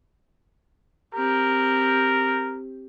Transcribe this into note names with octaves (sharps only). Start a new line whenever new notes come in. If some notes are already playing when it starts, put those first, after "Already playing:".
C4 G4 A#4